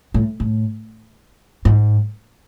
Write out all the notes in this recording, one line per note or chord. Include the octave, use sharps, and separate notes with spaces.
A2
A2
G#2